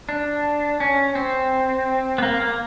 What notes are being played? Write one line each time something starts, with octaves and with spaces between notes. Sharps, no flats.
D4
C#4
C4
B3
A#3
A#3